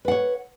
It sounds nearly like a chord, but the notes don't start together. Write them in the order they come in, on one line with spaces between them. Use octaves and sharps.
B4 F#5 C#5